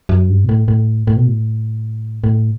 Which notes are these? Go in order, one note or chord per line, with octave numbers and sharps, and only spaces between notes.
F#2
G2
B2
A2
A2
A2
B2
A2
A2